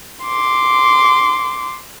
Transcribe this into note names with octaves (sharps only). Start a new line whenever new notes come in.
C6 D6